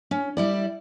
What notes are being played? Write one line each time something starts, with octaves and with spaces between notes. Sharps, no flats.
C#4
G3 E4 D5